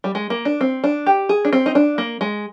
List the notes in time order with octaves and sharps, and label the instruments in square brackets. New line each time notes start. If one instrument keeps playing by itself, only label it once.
[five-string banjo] G3
G#3
A#3
D4
C4
D4
G4
G#4
D4
C4
D#4
D4
A#3
G#3